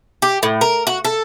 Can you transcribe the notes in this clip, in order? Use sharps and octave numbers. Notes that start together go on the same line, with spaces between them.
G4
A2
A#4
F#4
A4